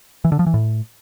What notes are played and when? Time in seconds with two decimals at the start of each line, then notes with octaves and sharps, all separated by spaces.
0.25 E3
0.32 D3
0.39 F3
0.46 E3
0.54 A2